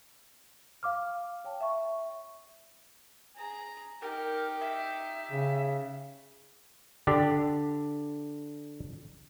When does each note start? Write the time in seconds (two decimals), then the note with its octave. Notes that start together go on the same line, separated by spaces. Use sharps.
0.83 F5 D6 F6
1.44 C#5 G5 A5
1.60 E5 C#6
3.37 G#4 A#5
4.02 D#4 G4 A#4
4.61 E5
5.32 C#3
7.07 D3 D4 G4